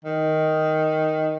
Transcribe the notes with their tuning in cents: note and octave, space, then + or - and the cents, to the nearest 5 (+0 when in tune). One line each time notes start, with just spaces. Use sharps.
D#3 +5